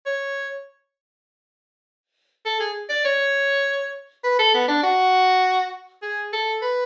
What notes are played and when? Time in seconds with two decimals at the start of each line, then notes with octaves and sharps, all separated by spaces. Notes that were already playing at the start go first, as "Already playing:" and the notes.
0.06 C#5
2.45 A4
2.60 G#4
2.89 D5
3.05 C#5
4.24 B4
4.39 A4
4.54 B3
4.68 D4
4.83 F#4
6.03 G#4
6.33 A4
6.62 B4